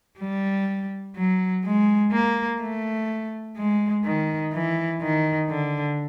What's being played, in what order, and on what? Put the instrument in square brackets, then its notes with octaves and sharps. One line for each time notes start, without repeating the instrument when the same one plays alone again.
[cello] G3
F#3
G#3
A#3
A3
G#3
D#3
E3
D#3
D3